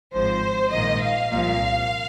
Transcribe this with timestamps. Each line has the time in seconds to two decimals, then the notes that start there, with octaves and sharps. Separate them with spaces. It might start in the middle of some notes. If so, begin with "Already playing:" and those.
0.14 G#1 G#2 F3 C5
0.72 A#1 G#2 D#3 A#3 D#5
1.03 F5
1.31 C2 A#2 F3